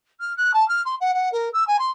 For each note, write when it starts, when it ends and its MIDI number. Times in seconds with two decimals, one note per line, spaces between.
0.20 0.33 89
0.36 0.51 90
0.53 0.66 81
0.68 0.80 89
0.85 0.95 84
1.00 1.11 78
1.13 1.29 78
1.32 1.48 70
1.53 1.65 88
1.67 1.76 80
1.78 1.90 84